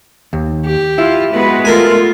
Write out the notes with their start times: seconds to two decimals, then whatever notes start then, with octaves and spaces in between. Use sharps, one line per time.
0.33 D#2
0.65 G4
0.98 E4 F4
1.33 G#3 B3 F#4 B4
1.65 A3 B3 F4 A4 A#4 G#5